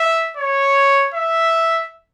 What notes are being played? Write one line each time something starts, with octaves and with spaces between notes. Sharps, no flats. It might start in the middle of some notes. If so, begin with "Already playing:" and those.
Already playing: E5
C#5
E5